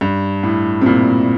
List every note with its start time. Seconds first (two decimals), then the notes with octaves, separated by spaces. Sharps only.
0.01 G2
0.43 A2
0.81 C3
0.86 A#2